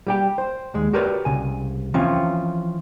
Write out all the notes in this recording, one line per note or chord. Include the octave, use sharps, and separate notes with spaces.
G3 G4 G5
C5
D#2 G#3
F#4 G4 A#4 B4 C#5 D5
C2 C#3 G#5
E3 F3 C4 C#4 F4